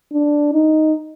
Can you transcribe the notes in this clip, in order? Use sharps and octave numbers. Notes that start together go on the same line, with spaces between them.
D4
D#4